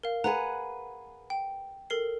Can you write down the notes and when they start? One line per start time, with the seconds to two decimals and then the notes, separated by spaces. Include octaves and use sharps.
0.03 A#4 F5
0.24 G#4 B4 F#5 A#5
1.30 G5
1.90 A4 A#4 C7